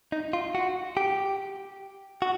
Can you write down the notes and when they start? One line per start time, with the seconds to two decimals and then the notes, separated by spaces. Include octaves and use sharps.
0.12 D#4
0.33 F4
0.55 F#4
0.97 G4
2.22 F#4